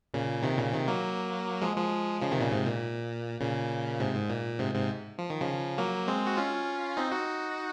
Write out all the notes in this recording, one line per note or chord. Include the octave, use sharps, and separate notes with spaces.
A#2 C#3
C3 D#3
A#2 C#3
C3 D#3
F#3 A#3
F3 G#3
F3 G#3
C#3 F3
C3 D#3
A#2 C#3
G#2 C3
A#2
A#2 C#3
G#2 C3
G#2
A#2
G#2 C3
G#2 C3
F3
D#3
C#3 F3
F#3 A#3
G#3 C4
F#4
C#4 F4
C4 D#4
D#4 F#4